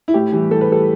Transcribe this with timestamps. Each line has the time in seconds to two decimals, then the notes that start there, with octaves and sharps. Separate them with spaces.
0.08 E4
0.14 A2 G4
0.32 E3 G3
0.51 A2 A4
0.61 B4
0.69 E3 G3 A4